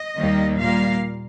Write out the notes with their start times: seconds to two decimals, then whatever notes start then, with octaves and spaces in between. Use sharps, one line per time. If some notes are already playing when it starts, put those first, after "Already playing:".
Already playing: D#5
0.17 D#2 D#3 G3 A#3
0.58 A#2 G3 A#3 F5